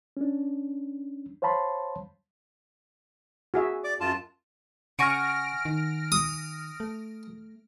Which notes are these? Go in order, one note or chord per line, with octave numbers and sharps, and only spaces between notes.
C#4 D4
C5 C#5 F5 A5 B5 C6
F#4 G#4 E5
D5 D6
F#2 F4 A5
C#3 F#5 G#5 C#6 F6 A#6 D7
D#3
D#6
A3